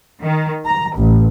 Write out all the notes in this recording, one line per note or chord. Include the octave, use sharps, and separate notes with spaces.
D#3
A#5
A1